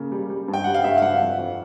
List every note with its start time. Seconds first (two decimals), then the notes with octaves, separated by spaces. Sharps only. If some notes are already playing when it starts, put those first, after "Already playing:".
Already playing: C#3 A#3
0.12 G3
0.30 G3
0.48 G2
0.53 G5
0.64 G3 F#5
0.74 F5
0.84 G2 E5
0.98 F5
1.02 G2 F#5
1.20 F2
1.39 F2